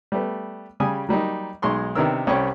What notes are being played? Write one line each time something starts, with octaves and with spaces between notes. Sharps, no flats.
G3 A3 B3
C#3 G3 G4 G#5 D#6
F#3 G3 A#3 D#4
B1 G#3 D#4 C6 C#6
C3 D#3 B3 D4 A#4 E6
C2 G3 C#4 G4 C#5 C#6